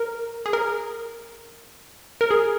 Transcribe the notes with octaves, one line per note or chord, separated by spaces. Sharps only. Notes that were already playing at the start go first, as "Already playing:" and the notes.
Already playing: A#4
G#4
A#4
A#4
G#4